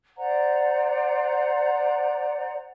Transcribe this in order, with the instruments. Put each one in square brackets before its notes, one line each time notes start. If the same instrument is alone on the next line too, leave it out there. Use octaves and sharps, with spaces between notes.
[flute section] C5 D5 F#5 A#5